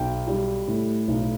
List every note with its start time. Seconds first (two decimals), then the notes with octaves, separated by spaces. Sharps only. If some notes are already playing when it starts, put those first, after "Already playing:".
Already playing: B1 G5
0.27 G3
0.68 A2
1.08 B1